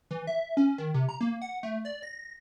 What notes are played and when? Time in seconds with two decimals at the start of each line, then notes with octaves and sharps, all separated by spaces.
0.11 E3
0.27 E5
0.57 C#4
0.78 D#3
0.94 C3
1.09 A#5
1.21 A#3
1.42 F#5
1.63 A3
1.85 D5
2.02 A#6